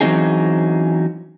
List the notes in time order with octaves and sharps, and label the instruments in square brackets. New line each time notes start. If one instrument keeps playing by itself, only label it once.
[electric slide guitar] E3 F#3 C4 C#4 D#4 G#4